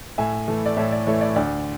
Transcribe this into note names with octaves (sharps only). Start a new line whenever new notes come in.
A2 E5 G#5
E3 A3
D5
A2 C#5 E5
D5
E3 A3 C#5
D5
D2 D5